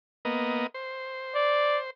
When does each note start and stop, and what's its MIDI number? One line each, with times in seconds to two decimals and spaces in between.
0.25 0.67 58
0.25 0.67 59
0.25 0.67 75
0.74 1.90 72
1.35 1.79 74